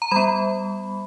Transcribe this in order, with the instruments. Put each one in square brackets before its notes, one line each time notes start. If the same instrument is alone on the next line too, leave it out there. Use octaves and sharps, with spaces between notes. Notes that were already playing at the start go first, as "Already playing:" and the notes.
[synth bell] A#5
G3 B3 B5